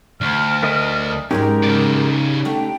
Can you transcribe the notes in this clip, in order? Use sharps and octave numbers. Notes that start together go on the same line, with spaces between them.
D2 F6
A3 A#4 D#5
G#2 F#3 G#3 C#4 D#4 G4 A#4
C#3 D5
D3 A3 G5